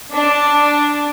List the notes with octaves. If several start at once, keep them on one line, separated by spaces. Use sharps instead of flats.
D4